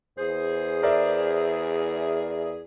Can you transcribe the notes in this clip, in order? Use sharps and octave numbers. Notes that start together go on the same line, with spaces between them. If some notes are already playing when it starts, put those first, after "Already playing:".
E2 G#4 C5
A#4 D5 E5